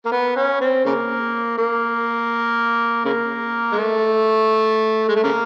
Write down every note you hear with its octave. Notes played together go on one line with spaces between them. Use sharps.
A#3
B3
C#4
C4
C#3 A#3
A#3
C#3 A#3
G#3
A3
G#3
A3
C#3 A#3